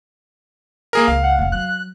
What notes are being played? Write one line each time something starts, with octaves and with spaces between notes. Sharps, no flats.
A#3 G#4 A#4
C#2 F5
F#5
F1 C4
F#3 F#6